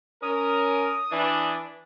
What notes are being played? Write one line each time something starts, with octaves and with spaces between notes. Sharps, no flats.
C#4 A#4 D#6
E3 D4